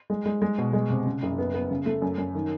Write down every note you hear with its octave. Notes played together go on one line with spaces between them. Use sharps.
G#3
G#3
G#3
B2
G#3
C3
C#3
F#1
B3
B3
C#3
A3
F#2
F#2
D#3